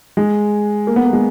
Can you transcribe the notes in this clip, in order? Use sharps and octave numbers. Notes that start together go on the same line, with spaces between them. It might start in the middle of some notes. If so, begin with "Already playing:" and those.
G#3
A#3
B3
A#3
G#3